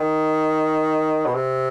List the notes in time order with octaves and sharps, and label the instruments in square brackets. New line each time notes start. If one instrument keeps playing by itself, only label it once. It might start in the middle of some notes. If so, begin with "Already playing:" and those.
Already playing: [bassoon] D#3
B2
C3